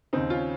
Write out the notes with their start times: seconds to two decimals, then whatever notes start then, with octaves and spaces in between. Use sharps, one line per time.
0.13 D#2 C#3 C4 D#4
0.30 C#4 F4